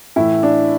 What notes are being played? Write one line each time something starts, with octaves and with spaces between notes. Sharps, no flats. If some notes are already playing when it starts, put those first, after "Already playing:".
A2 E3 E4
D4